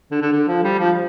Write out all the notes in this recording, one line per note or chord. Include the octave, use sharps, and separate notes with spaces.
D3
D3
D3
F3
G3
F3